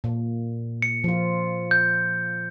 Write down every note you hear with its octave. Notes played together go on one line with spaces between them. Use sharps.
A#2
C#7
F3 F4
G6